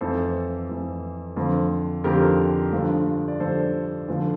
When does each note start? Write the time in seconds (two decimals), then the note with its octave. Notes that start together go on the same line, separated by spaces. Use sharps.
0.01 F2 E3 A4 C5
0.69 F2 E3
1.36 F2 D3 F3
2.04 F2 D3 F3 G4 A#4
2.73 G2 D3 F3
3.28 D5
3.40 G2 D3 F3 A4 C5
4.08 E2 D3 F3